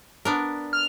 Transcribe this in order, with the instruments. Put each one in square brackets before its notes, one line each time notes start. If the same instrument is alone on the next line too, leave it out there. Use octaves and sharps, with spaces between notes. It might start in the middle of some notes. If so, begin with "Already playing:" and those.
[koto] B3 D4 A#4
[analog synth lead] F6